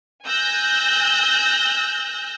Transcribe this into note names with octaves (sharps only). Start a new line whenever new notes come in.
G#5 E6 F#6 G6 A#6